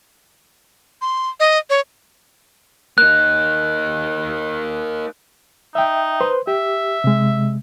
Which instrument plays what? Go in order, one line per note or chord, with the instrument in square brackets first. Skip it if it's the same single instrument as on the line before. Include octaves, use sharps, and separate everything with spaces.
[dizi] C6
D#5
C#5
[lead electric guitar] A#3 D#4 [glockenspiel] F#6
[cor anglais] D#4 [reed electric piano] E5 G5
[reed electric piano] B4 C5 C6
[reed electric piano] G4 [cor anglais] E5
[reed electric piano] C3 G#3